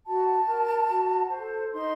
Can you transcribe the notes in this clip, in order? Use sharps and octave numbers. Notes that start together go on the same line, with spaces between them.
F#4 A5
A#4
F#4
C5
A4
D#4 C6